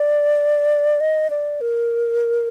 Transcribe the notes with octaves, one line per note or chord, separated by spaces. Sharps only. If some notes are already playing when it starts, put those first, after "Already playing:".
Already playing: D5
D#5
D5
A#4